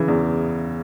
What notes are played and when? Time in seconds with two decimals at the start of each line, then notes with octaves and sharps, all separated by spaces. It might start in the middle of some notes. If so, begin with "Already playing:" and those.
Already playing: C#3 E3
0.08 E2